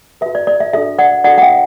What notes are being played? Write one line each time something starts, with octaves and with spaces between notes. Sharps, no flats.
F#4 B4 E5
D5
D5
E5
D4 F#4 A4 E5
D5 F#5
D4 F#4 A4 D5 F#5
F#5
E5 G5